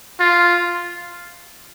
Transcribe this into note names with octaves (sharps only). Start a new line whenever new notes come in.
F4